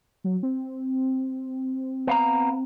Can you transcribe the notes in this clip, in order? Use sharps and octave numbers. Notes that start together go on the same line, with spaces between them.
F#3
C4
B3 F5 A#5